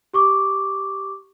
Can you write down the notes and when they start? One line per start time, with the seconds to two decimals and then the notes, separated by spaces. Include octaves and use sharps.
0.14 G4 C#6 D6